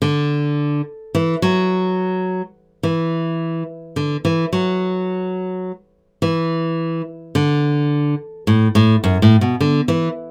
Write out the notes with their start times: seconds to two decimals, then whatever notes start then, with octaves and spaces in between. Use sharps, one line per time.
0.02 D3
1.15 E3
1.42 F#3
2.83 E3
3.96 D3
4.25 E3
4.53 F#3
6.22 E3
7.35 D3
8.47 A2
8.75 A2
9.04 F#2
9.22 A2
9.41 B2
9.61 D3
9.88 E3